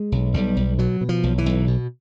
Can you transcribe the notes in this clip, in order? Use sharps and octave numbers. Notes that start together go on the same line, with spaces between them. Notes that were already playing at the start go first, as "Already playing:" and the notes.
Already playing: G#3
B1
B1 G3
B1
B2 F#3
B2
F3
B1
E3
B1
B2